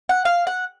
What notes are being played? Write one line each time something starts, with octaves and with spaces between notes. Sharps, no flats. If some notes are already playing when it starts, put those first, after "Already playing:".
F#5
F5
F#5